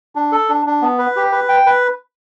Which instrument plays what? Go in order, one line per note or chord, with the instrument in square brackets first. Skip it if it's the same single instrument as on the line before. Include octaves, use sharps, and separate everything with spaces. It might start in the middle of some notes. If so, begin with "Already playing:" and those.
[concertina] D4
A4
D4
D4
B3
B4
G4
B4
G5
B4